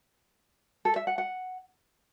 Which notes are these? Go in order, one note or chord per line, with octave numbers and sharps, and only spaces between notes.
A4
E5
F#5
F#5